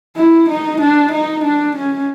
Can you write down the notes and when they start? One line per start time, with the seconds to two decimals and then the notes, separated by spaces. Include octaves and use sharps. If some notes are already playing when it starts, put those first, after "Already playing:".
0.17 E4
0.49 D#4
0.81 D4
1.12 D#4
1.45 D4
1.76 C#4